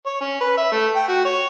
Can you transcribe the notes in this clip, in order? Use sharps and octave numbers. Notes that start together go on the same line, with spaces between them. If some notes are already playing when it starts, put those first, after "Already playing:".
C#5
C#4
B4
E5
A3
G5
F#4
C#5